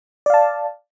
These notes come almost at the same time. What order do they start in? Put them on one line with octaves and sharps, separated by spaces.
D5 F5 A5